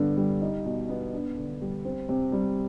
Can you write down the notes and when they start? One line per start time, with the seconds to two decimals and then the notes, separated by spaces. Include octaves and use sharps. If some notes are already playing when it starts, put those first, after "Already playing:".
Already playing: G2 D3 B3
0.17 G3
0.41 D#4
0.65 B2
0.89 B3
1.13 D4
1.37 D3
1.61 G3
1.85 C4
2.09 C3
2.32 G3